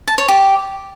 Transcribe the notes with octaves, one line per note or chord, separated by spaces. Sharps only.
A5
C#5
G4